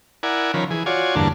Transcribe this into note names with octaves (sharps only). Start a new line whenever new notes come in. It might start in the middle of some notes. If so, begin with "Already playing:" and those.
E4 A#4 D5 F#5 G#5
D#3 F3 C#4 A#4 B5
E3 G#4
F4 F#4 C#5 D5 G#5
E2 G2 D3 A#3 D4 A5